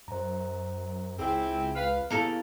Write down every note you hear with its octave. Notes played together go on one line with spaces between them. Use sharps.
F#2 C5 A#5
C#2 C4 E4 G#4 G5
B4 F5
C#3 A#3 B3 E4 G4 A4 A#4